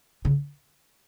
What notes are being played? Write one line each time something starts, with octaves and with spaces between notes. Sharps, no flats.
C#3